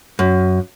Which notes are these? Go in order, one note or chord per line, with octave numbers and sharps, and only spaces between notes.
F#2